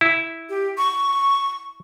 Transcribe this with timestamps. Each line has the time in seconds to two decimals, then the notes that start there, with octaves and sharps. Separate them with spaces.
0.01 E4
0.49 G4
0.78 C#6